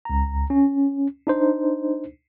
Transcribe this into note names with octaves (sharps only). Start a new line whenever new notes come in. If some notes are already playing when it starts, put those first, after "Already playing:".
C#2 A#5
C#4
D4 D#4 C5